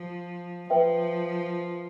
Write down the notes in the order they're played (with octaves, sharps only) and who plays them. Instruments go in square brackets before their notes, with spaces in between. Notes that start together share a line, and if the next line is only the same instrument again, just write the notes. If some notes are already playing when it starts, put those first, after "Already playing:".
Already playing: [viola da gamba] F3
[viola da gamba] F3 [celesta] B4 E5 G5